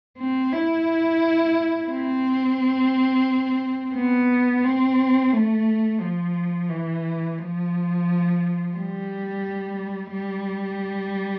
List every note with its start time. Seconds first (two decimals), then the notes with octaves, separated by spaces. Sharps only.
0.18 C4
0.52 E4
1.89 C4
3.95 B3
4.64 C4
5.32 A3
6.01 F3
6.69 E3
7.38 F3
8.75 G3
10.12 G3